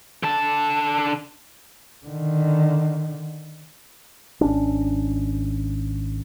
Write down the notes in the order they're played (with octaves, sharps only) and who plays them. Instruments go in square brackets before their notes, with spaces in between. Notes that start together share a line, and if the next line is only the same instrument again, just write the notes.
[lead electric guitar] D3 A5
[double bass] D3 D#3
[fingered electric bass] G#1 C#4 D4